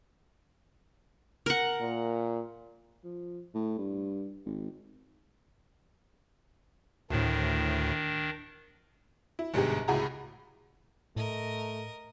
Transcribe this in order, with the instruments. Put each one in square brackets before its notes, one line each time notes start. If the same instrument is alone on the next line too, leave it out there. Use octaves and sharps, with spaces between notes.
[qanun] A#4 F#5
[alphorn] A#2
[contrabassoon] F3
A2
G2
G#1
[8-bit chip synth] D2 A2 [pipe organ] D#3 D4
[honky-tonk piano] E4
G1 G#2 B2 G4 G#4
C#2 A2 F#4 G#4 A#5
[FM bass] A2 [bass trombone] A3 [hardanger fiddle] A#4 D#5